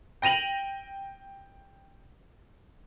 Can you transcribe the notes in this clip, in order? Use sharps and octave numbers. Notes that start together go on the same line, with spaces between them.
G5 A#6 D#7 F7 F#7